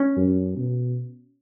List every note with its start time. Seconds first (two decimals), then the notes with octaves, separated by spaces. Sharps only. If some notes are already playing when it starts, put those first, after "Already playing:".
Already playing: C#4
0.17 F#2
0.57 B2